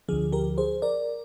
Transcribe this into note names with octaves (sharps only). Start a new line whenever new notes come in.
D2 D3 F3 G#4
G4 A#4
G#4 C5
A#4 D5